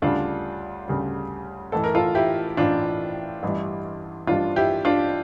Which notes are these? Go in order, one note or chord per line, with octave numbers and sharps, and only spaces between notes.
D2 C#3 G3 D4 F4
D2 C#3 G3
A1 A2 E3 A4
A#4
F4 A4
E4 G4
A1 A2 E3 D4 F4
A1 G2 E3 G3
A1 G2 E3 G3 D4 F4
E4 G4
D4 F4